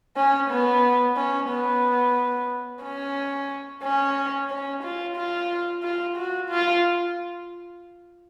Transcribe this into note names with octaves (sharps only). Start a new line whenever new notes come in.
C#4
B3
C#4
B3
C#4
C#4
C#4
F4
F4
F4
F#4
F4